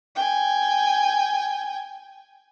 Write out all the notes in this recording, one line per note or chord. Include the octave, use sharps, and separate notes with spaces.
G5 G#5